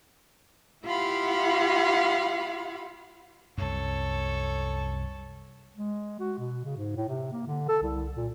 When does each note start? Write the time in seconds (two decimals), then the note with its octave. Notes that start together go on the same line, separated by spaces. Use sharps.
0.86 E4 F4 G4 F5 F#5 B5
3.58 C2 F#2 A4 C#5
5.77 G#3
6.20 F#4
6.38 B2
6.64 C#3
6.77 G#2
6.97 A2
7.08 C3
7.32 A#3
7.47 D3
7.69 A4
7.82 C2
8.17 A#2